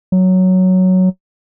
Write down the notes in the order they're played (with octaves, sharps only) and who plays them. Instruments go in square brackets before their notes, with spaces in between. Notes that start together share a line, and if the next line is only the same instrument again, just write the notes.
[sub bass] F#3